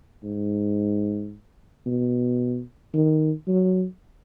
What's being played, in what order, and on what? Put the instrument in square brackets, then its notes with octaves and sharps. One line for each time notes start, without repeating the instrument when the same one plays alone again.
[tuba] G#2
B2
D#3
F#3